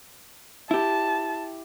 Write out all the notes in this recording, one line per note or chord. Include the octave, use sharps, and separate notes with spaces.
E4 G4 A5